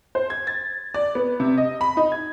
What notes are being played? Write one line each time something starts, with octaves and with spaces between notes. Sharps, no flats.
C5
G#6
A6
D5
B3
C3
D#5
B5
D#4
G#6